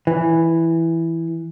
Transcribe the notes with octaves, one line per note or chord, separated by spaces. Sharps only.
E3